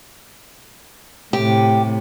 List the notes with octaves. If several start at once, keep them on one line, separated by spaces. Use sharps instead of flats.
A2 C3 G4